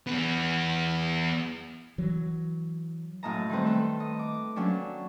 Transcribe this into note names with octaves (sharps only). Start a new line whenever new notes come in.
E2 B3
E3 F#3
F#2 A2 A#3 D#5 A5 A#5
D#3 G3 A3 C4 B4 C5
A4 B4 C5
D#5
D6
F#3 A#3 C#4 D4 G4